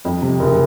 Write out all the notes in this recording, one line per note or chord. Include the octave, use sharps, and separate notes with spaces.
F2
C3
F#1